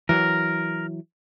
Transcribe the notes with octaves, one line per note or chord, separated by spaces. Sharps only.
E3 F#3 A#4